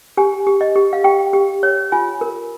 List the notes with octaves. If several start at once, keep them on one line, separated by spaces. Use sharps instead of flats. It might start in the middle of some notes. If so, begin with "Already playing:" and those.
G4 G#5
G4
D#5
G4
F5
G4 G5
G4
C#5
F4 G#5
A#4